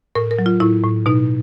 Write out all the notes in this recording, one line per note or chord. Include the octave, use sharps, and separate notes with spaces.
A2 A#4
A#4
F#3
F4
A2 E4
A2
B2 D#4